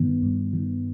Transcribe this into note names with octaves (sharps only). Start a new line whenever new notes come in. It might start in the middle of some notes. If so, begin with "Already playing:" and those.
Already playing: G2 D#3 B3
G2
D#3